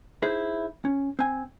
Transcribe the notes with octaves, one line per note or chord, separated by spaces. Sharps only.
D#4 E4 G#4 C5
C#4
C4 G#5